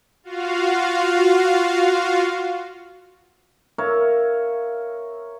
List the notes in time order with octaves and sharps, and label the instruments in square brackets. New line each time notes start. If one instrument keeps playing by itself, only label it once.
[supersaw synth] F4 F#4 F5
[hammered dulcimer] A#4 C#5 E5 F5